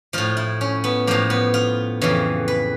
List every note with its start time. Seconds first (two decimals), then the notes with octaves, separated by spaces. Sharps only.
0.13 A2 F3 F4
0.37 E4
0.61 C#4
0.84 B3
1.07 A2 F3 A#3
1.30 B3
1.54 F4
2.01 F2 C#3 E3
2.48 B4